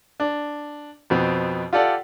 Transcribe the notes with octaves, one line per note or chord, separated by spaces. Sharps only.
D4
F2 B2 C4
F4 G4 A4 D5 F#5